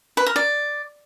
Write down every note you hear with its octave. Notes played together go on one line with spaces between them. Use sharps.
B4
A#4
D5